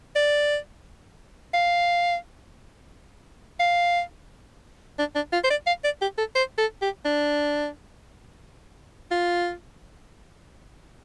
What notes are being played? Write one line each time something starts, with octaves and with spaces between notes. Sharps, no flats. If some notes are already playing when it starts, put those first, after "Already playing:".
D5
F5
F5
D4
D4
F4
C5
D5
F5
D5
G4
A4
C5
A4
G4
D4
F4